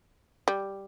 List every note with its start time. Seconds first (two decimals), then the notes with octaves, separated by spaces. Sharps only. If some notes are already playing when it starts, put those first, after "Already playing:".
0.48 G3